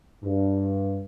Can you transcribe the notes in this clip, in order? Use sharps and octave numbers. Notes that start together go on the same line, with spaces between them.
G2